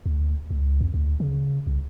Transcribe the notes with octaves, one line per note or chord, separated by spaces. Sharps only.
D2
C#2
F2
D2
C#3
C2